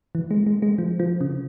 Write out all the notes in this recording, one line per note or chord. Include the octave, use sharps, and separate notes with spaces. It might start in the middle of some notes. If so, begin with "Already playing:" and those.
E3
G#3
G#3
G#3
F3
F3
C#3